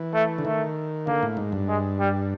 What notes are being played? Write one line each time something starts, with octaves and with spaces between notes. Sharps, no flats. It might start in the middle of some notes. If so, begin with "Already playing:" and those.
Already playing: E3
A3
D3
D#3 A3
D3 A#3
A2
G#2
G2
G#3
G3